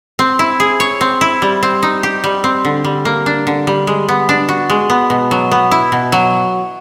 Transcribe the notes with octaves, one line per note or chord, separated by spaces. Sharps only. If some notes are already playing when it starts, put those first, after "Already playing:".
C4
E4
G#4
C#5
C4
E4
G3
C4
D#4
G4
G3
C4
D3
G3
A#3
D4
D3
G3
G#3
B3
D4
F#4
G#3
B3
B2
F#3
B3
E4
B2
F#3